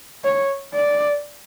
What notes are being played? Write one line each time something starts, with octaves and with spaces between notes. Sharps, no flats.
C#5
D5